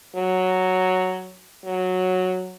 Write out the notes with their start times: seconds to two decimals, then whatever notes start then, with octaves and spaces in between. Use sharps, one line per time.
0.15 F#3
1.64 F#3